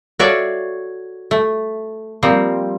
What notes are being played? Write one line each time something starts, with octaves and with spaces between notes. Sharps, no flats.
F#4 A4 C#5 D5 E5 F5
A3
F3 G3 A#3 C4